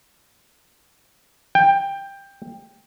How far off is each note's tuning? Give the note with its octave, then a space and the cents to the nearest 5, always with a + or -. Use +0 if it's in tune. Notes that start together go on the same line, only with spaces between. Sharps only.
G5 +15